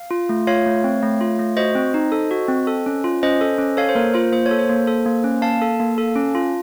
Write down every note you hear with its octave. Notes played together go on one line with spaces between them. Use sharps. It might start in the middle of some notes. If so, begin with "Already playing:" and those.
Already playing: F5
F4
A3
F4 C#5 F5
A3
C4
A3
F4
A3
F#4 C5 D#5
C4
D#4
A4
F#4
C4
A4
C#4
F4
C#4 C5 D#5
A4
C#4
A4 C#5 F5
C5
A#3 A#4
F4 C5
A#3 C5
C#5
A4
C5
A#3
A4
A#3
C#4
A#3 F5 A5
A4
A#3
A4
C#4
F4